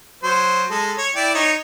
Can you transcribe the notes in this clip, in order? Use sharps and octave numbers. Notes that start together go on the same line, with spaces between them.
F#3 C5
G#3 A4
C#5
E4 D5 G5
D#4 C#5